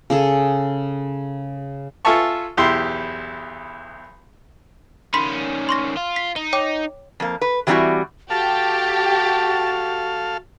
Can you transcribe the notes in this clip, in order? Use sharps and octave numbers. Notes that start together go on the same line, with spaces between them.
C#3 G#4 A4
F4 A4 E5 G#5 A5 C#6
B1 E2 E4 G4 C6
D#3 C#4 B5 C6 B6
C6 C#6 A#6
F4
B6
D#4 G7
C#5 G5 D6
F2 A#3
B4
E3 F#3 G3 C4 E4 F#4
F#4 G4 A4 F5 A5